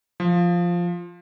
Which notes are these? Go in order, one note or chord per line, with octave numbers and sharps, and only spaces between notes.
F3